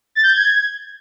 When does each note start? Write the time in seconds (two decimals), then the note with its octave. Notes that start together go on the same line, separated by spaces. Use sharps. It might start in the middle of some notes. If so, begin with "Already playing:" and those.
0.15 A6
0.23 G6
0.31 G#6